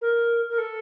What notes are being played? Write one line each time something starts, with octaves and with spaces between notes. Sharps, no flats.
A#4
A#4
A4